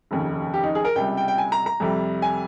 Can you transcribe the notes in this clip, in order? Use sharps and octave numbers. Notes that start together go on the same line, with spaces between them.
F1 D#2 C#3
G4
D#4
G#4
A#4
C#2 C3 G3 G5
G5
G5
G#5
A#5
A#5
F2 C3 G3
G#5